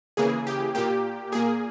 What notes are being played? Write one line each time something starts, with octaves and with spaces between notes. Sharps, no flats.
C#3 E3 A#3 G#4
G4
A#2 A#3 G4
A#2 A#3 G#4